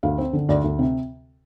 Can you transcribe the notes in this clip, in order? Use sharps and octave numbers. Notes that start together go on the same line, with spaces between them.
D2 F5
C4
D3
D2 D5
D2
C3